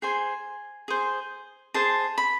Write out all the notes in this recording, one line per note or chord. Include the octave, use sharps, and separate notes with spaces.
G#4 C5 G#5
G#4 C5
G#4 C5 A5
B5